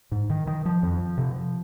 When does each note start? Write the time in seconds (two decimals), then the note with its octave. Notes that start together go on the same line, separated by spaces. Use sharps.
0.12 G#2
0.30 D#3
0.47 D#3
0.65 F3
0.83 F2
1.18 C3